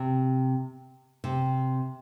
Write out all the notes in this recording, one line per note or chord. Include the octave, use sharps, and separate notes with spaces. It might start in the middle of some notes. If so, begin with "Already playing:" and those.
Already playing: C3
C3